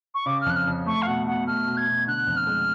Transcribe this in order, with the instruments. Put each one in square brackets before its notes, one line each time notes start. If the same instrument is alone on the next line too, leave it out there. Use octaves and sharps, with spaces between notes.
[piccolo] C#6
[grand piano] C#3 [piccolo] D6
[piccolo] F6
[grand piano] F2 [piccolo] F#6
[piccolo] F6
[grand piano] F2
[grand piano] A3 [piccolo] C#6
[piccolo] F5
[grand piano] B2 [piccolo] F#5
[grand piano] B2 [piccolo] F#5
[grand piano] A3 [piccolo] F6
[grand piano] B2
[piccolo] G#6
[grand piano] B2
[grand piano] D3 [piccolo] F#6
[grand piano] F2
[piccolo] F6
[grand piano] G#3